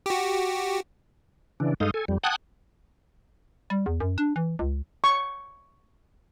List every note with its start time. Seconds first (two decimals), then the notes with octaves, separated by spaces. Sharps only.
0.06 F#4 G4
1.60 C#3 E3 D4
1.80 G2 G#3 D#4 A4 F5 D#6
1.94 A4 G#5
2.08 F2 G3
2.24 F#5 G5 A5 D#6 F#6 G#6
3.70 G3
3.86 E2
4.00 F#2
4.18 D4
4.36 E3
4.59 C#2
5.04 C#6